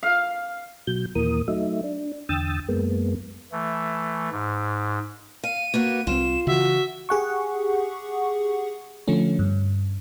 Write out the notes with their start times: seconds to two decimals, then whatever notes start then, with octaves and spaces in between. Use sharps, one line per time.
0.03 F5
0.87 B2 F#3 G6
1.15 D#2 A#2 E3 A#3 A#4 D#6
1.48 F#3 A3 D#4 E5
1.84 D4
2.29 E2 D3 G5 D#6 E6 A6
2.68 F#2 G#3 A#3 B3
3.52 E3 A3
4.32 G#2
5.44 F5 D#7
5.74 A#3 B3 F#4
6.07 C2 F#3 C4 F4 E7
6.47 C#3 E3 F#4 E5
7.09 G4 G#4 F#5 C#6
9.08 D3 F3 A3 C#4
9.39 G2